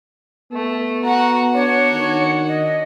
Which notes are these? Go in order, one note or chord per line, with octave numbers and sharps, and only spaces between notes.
A3 B3
F#4 F#5 A#5
D4 F#4 C#5
D#3
D#5